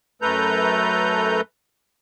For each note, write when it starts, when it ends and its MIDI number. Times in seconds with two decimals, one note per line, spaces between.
0.22 1.41 42
0.22 1.41 57
0.22 1.41 69
0.22 1.41 71
0.22 1.41 82
0.22 1.41 91